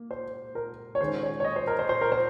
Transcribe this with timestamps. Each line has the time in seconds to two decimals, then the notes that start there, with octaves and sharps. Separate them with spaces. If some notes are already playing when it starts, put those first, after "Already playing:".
Already playing: A#3
0.11 C5
0.55 A#4
0.95 C#5
1.01 D#3 G#3 C#4 C5
1.23 C#5
1.40 C#5
1.44 D#5
1.56 C5
1.67 A#4
1.79 C5
1.89 C5
2.01 A#4
2.12 C5